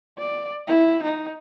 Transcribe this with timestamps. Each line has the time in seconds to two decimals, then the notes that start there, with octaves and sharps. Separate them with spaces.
0.18 D5
0.67 E4
1.03 D#4